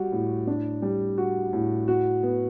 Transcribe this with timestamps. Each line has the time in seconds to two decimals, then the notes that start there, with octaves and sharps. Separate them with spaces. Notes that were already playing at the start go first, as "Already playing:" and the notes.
Already playing: G3 F#4
0.12 A2
0.47 D4
0.82 G3
1.18 F#4
1.53 A2
1.88 F#4
2.23 B3